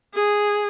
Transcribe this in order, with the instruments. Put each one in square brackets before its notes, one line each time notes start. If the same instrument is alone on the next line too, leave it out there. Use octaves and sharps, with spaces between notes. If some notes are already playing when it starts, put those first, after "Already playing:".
[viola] G#4